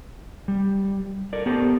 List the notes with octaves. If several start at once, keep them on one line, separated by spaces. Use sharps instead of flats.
G3
A4 A#4 D5
B3 G4 A4 A#4 C5